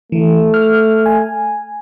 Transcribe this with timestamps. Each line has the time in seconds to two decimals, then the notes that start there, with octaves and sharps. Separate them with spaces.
0.12 E3 A3
0.54 F6
1.06 G#5